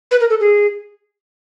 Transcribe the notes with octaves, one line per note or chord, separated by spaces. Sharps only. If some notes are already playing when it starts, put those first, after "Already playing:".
B4
A#4
A4
G#4